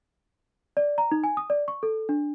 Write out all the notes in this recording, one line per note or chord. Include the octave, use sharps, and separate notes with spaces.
D5
A#5
D#4
G#5
D#6
D5
C#6
A4
D4